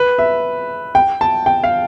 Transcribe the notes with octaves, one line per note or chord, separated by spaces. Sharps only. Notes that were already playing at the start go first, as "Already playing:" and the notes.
Already playing: B4
E5
G5
A5
G5
F5